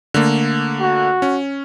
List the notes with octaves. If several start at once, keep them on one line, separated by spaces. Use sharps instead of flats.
D3 A3 A#3
F#4
C#4